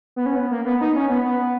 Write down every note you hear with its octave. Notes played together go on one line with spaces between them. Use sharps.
B3
C#4
B3
A#3
B3
D#4
C#4
B3
B3